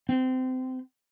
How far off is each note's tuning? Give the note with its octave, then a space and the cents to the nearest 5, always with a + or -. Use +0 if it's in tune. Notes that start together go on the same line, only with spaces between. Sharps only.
C4 -25